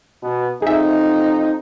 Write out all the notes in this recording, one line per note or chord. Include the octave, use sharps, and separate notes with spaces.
B2 B3
F2 D#4 G#4 E5